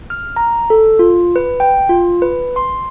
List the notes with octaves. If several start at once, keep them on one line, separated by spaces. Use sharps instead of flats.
F6
A#5
A4
F4
B4
G5
F4
B4
C6